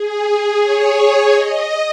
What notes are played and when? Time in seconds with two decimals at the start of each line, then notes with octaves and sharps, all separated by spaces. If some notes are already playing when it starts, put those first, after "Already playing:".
Already playing: G#4
0.26 G#4
0.62 C#5
1.31 D#5